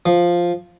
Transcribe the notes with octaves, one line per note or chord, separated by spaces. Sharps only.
F3